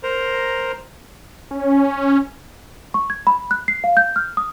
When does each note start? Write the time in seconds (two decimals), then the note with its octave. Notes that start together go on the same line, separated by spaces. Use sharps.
0.03 A#4 C5 A#5
1.51 C#4
2.94 C#6
3.10 G#6
3.27 B5
3.51 F#6
3.68 C7
3.84 F5
3.97 G6
4.16 F6
4.37 D#6